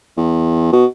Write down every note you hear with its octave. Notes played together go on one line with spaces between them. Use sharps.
E2
B2